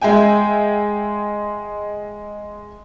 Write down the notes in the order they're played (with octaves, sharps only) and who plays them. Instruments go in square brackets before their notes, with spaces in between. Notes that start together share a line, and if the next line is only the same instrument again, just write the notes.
[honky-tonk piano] G#3 E5 G5 G#5